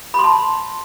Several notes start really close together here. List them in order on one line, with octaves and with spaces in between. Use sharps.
B5 C6 A5